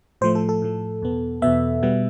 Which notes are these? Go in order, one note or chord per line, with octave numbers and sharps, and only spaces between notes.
A2 F3 A3 C5
A4
A4
A2 F3 A3
E2 B2 B3
E2 B2 B3 E5
B2 G3 B3